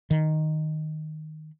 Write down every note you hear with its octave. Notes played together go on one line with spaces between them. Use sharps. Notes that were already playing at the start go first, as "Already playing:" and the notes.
D#3